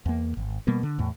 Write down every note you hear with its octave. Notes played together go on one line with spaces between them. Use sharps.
E2 A#3
G#1
B2 G3 A#3 B3
D3
E2 A2